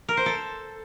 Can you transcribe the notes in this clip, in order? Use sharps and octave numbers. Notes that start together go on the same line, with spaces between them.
A#4
C5
A4